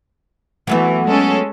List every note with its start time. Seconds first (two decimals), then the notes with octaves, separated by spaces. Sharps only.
0.67 E3 F#3 A3 B3
1.07 G#3 C#4 A4